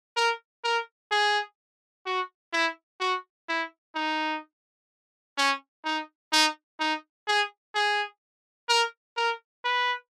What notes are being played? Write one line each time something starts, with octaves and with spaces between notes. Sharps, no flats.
A#4
A#4
G#4
F#4
E4
F#4
E4
D#4
C#4
D#4
D#4
D#4
G#4
G#4
A#4
A#4
B4